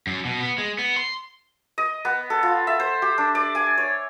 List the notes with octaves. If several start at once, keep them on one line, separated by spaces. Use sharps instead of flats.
F#2
B2
B3
G#3
B3
C6
D#5
B3
A4
F4
E5
C5
G4
D4
D5
G#5
C#5